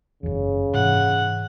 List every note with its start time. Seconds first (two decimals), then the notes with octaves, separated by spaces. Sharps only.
0.23 F#1 E2 C#3
0.74 G#2 C3 E3 F#5